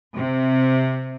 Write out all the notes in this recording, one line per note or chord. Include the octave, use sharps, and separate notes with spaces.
C3